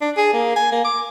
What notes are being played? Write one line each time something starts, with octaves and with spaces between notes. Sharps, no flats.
D4
G#4
A#3
G#5
A#3
D6